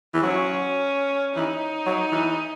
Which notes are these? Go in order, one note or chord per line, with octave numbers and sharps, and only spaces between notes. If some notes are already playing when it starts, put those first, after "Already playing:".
E3
F#3 C#4
E3 D#4
F#3
E3